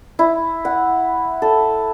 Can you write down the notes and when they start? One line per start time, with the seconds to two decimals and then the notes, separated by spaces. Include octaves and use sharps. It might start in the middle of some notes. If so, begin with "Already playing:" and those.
0.19 E4
0.65 F#5
1.42 A4